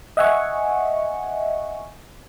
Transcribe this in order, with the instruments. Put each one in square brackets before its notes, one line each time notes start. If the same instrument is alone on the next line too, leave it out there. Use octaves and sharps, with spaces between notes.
[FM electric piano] D#5 E5 F#5 G#5 C#6